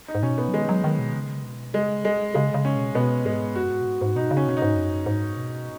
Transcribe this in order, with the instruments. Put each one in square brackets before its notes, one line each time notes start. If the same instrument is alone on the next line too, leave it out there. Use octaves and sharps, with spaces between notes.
[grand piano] D#4
[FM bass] G#2
[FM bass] B2 [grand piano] C#4
[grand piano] B3
[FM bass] F#3
[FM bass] D#3 [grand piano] G#3
[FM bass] F#3
D#3
B2
C#3
B2
[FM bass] C#3 [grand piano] G#3
[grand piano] G#3
[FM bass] C#3 [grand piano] G#3
[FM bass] C#3
[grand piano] C#4
[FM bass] B2
[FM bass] B2 [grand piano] B3
[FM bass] G#2 [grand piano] G#3
[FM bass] F#2 [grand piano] F#4
[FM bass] G#2
B2
G#2
G#2
[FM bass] B2 [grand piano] D#4
[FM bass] C#3
[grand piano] C#4
[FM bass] B2 [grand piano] C#4
[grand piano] D#4
[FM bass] G#2
F#2
G#2
B2